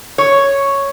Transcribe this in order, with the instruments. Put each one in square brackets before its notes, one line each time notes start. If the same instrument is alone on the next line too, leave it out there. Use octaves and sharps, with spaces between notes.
[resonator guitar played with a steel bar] C#5